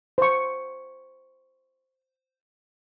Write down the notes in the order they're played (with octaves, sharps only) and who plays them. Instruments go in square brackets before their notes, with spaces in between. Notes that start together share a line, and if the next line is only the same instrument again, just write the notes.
[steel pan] C5 C#6